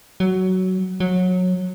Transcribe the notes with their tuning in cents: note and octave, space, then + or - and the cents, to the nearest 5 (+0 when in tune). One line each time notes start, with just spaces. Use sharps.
F#3 +10
F#3 -20